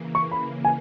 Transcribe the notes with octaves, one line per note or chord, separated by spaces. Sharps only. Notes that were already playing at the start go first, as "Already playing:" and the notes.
Already playing: C#3 E3 A#3
C#6
B5
G#5